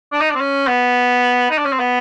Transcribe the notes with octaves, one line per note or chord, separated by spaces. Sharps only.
D4
D#4
D4
C4
C#4
B3
D#4
D4
C#4
C4
B3